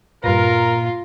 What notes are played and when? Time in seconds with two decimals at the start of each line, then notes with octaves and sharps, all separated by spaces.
0.24 G2 A#2 F4 A#4 B4 A#6